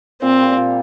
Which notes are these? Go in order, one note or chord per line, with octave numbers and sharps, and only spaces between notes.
A#2 C4
G3 A#3
A#2